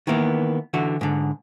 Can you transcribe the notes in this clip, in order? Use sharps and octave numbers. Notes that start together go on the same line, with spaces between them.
D#3 E3 A#3 B3
D3 E3 F#4
G#2 D3